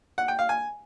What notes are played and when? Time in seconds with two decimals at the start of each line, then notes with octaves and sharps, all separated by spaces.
0.18 F#5
0.28 G5
0.39 F5
0.49 G#5